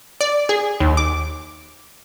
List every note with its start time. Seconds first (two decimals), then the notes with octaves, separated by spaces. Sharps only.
0.21 D5
0.49 G#4
0.80 D#2
0.97 D6